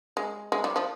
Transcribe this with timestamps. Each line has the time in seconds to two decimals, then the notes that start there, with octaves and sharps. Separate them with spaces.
0.17 G#3
0.52 G#3
0.64 G3
0.76 F3